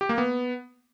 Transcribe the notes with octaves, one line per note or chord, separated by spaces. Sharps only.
G4
A#3
B3